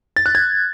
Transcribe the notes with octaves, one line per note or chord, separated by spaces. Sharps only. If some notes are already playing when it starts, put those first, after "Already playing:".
A6
F#6
G#6